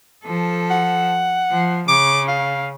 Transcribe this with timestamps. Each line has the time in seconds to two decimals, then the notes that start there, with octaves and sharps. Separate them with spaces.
0.25 F3 A4
0.71 F#5
1.51 F3
1.88 C#3 D6
2.28 F5